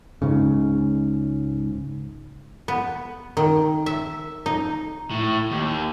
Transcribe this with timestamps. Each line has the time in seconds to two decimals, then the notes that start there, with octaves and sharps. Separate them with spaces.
0.22 C#2 G#2 C#3
2.68 B3
3.37 D#3
3.86 E5
4.46 D#4
5.10 A2
5.51 D#2